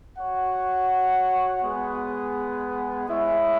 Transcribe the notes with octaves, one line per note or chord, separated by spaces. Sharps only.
F#4 C#5 F#5
G#3 B3 G#4
G#3 E4 C#5 E5